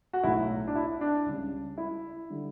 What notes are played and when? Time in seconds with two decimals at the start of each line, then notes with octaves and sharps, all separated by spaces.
0.13 F#4
0.23 B1 A2 F#3 E4
0.67 D4
0.76 E4
1.01 D4
1.26 C#2 C#3 G3
1.78 E4
2.30 D3 G3